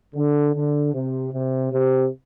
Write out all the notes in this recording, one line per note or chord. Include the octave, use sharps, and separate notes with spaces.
D3
D3
C3
C3
C3